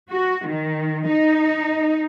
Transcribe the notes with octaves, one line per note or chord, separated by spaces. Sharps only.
F#4
D#3
D#4